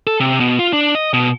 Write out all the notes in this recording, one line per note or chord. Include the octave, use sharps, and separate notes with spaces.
A4
C3
B2
F4
D4
D#5
B2